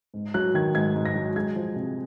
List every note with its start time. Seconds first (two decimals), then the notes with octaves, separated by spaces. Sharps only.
0.14 G#2
0.34 F#3 F#6
0.54 D#3 G#6
0.74 G#2 G#6
0.96 G#2
1.05 A#6
1.15 F#3
1.36 G#3 G#6
1.56 F3
1.76 C3